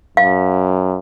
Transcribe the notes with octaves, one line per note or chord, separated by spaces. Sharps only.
F#2 F5